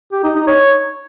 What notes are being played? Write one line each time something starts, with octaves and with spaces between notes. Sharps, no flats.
G4
D#4
D#4
C#5